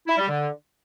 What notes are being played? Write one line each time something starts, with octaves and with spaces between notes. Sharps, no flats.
E4
G3
D3